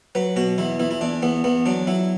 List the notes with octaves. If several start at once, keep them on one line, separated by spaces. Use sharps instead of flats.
F#3 B4
B2 F#4
E2 E4
E2 E4
E4
E2 D4
E2 B3
E2 B3
F#3 D4
F#3 E4